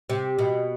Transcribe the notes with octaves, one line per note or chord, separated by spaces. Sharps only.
C3
B2